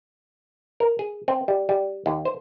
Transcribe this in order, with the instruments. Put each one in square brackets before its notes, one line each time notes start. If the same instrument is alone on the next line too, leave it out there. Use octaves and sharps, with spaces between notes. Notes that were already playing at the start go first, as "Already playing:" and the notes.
[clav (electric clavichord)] A#4
G#4
C4
G3
G3
D#2
C5